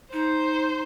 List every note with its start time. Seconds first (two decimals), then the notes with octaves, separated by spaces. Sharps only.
0.13 D#4 C5